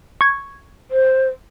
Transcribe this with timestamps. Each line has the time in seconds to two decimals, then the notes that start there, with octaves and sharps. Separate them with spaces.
0.21 C#6 G#6
0.91 C5